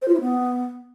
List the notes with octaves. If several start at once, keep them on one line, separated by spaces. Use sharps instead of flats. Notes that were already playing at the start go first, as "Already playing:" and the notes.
C5
F4
E4
B3